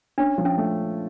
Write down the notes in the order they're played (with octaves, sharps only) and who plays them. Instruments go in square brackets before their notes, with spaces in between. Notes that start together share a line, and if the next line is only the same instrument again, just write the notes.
[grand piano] C#4 [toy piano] D4
[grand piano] F3
[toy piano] C#4
[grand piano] A3